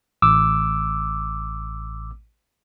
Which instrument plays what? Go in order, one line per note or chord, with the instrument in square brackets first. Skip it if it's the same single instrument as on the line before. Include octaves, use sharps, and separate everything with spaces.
[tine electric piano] A1 D6 E6